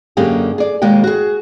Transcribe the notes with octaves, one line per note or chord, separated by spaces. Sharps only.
F#2 D3 A#3 G4 G#4
G#4 D5
D#2 B2 G#3 A#3 G5
F#4 G#4